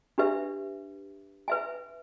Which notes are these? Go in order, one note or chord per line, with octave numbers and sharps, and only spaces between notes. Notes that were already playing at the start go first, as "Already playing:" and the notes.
D4 G4 B4 E5
B4 E5 G#5